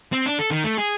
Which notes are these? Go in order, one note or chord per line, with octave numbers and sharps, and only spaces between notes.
C4
D4
A4
D#3
A3
G#4